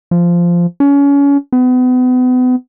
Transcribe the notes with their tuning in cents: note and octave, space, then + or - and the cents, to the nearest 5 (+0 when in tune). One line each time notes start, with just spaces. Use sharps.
F3 -10
C#4 +30
B3 +35